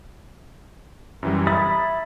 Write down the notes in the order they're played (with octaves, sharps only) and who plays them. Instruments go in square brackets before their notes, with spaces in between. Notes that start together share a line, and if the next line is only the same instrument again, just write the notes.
[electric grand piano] F#2 E3 G3
[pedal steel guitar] E5 B5 D#6 [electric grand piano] A#5 G#6 A6